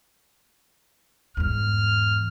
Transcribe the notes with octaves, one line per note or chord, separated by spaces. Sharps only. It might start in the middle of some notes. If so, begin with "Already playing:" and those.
E2 G#2 F6